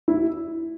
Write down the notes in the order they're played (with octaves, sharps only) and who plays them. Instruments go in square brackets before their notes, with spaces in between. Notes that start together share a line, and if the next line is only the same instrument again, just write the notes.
[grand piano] E4